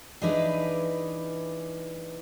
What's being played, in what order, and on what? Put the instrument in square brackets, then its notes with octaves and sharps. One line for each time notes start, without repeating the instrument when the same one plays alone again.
[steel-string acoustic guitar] E3 D4 D#4 G#4 B4 D5